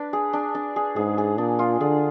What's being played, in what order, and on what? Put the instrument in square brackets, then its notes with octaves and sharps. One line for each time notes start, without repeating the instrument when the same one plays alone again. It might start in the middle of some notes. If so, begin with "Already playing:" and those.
Already playing: [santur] D4 B4
G#4
D4
D4
G#4
[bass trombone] G#2 [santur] G#4
[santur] G#4
[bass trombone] A#2 [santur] D4
[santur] F4
[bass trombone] D3 [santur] G#4